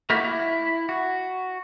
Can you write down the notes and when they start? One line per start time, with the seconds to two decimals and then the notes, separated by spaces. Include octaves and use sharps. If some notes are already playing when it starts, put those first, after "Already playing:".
0.10 A3 A#3 D#4 E4 F#4
0.23 E4
0.89 F#4